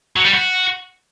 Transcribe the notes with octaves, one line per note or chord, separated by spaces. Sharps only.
F#3
G3
F#4